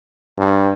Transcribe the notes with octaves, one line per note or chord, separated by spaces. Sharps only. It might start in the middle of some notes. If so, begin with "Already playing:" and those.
G2